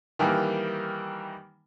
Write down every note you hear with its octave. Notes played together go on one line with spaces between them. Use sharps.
D#3 E3 G3 A#3